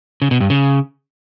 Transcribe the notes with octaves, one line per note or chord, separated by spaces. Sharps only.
C#3
B2
G2
C#3